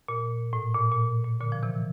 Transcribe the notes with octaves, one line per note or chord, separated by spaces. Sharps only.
A#2
A2
A#2
A#2
A#2
A#2 D3
F3
C3 E3